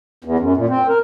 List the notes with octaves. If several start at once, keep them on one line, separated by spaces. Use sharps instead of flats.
E2
F#2
A#2
C4
A#4